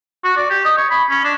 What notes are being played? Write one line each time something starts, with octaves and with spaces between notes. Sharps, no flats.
F#4
D5
G4
D#5
C#5
B5
C#4
D4